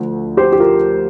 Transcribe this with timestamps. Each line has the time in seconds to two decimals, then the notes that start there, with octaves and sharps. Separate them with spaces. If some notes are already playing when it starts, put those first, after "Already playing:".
Already playing: D2 D3 F3
0.37 G4 C5
0.53 G4
0.59 F4 A#4